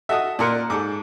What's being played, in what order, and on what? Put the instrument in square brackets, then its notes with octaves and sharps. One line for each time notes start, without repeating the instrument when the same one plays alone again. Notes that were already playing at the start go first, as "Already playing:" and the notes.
[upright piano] F#4 A4 D#5 [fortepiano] E5 D#6
[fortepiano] A#2 A#4 F#6 [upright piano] D5 C6 C#7
[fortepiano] G#2 [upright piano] G#4 A4 D6